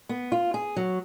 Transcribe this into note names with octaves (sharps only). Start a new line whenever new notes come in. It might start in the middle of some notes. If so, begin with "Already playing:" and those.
B3
F4
G#4
F#3